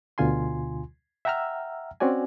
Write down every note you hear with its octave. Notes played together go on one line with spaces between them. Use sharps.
D2 B2 D3 F4 G#5 C6
E5 F#5 G5 A#5 E6 F6
C4 C#4 F#4 D5 G#5